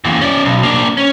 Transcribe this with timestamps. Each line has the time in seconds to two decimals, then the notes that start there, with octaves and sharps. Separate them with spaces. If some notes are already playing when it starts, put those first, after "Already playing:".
0.04 E2 A#2
0.21 C#4 D5
0.45 B1
0.63 A#3 D4
0.97 C#4